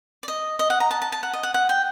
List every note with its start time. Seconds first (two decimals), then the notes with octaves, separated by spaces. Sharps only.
0.23 D5
0.28 D#5
0.59 D#5
0.70 F#5
0.80 A#5
0.91 A5
1.02 A5
1.12 A5
1.23 F#5
1.33 D#5
1.43 F#5
1.54 F#5
1.69 G5